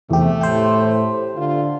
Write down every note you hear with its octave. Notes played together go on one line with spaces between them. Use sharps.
E2 C3 A3 G4
A2 G4 C5
D3 F4